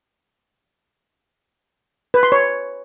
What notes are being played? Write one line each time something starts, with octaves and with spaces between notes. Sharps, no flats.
B4
C6
C#5